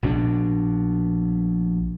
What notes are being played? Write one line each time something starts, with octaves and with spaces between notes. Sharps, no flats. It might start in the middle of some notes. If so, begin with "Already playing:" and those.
A#1 B2 C#4 D4